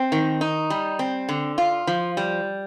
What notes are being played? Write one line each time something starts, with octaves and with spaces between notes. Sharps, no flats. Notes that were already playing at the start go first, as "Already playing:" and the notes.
Already playing: C4
D#3
D#4
G3
C4
D3
F4
F3
G3